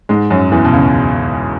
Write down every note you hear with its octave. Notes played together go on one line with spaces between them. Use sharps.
G#2 G#3
F#2 F#3
E2 E3
B2
C#2 C#3